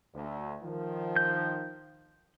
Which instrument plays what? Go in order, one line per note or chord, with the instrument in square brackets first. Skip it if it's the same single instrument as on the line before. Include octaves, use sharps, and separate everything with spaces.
[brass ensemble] D2
D#3 F3
[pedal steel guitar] G6